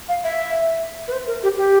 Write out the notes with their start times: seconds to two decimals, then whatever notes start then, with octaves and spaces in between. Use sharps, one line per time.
0.09 F5
0.24 E5
1.08 B4
1.12 C5
1.27 A#4
1.43 G4
1.57 G4